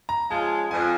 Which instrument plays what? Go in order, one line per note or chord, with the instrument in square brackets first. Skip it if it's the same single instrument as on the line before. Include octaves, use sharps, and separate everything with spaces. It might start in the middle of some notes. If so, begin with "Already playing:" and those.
[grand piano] A#5
[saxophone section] F3 G#3 C#4 F4 [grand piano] A5
[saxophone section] F2 [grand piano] G#5